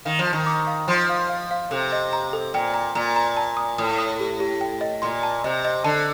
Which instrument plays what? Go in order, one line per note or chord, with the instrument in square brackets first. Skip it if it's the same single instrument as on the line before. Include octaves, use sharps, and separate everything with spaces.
[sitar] D#3 [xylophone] F5
[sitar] F3
[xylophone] A5
[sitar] D#3
[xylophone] D6
F5
[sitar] F3 [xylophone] C6
[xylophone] F5
F5
F5
[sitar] C3 [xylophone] A4
[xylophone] D#5
A#5
A4
[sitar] A#2 [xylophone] G5
[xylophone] A#5
[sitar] A#2 [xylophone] A#5
[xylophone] A#5
A5
D#6
[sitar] A2 [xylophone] D#6
[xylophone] D#6
G4
G4
G5
D#5
[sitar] A#2 [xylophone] C6
[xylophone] A5
[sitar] C3 [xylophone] D#5
[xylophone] D#5
[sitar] D3 [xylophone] A5